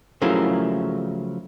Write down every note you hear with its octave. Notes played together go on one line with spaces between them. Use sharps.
C#3 F3 F#3 A3 E4 A#4